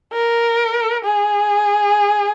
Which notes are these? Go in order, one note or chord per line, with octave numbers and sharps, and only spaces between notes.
A#4
G#4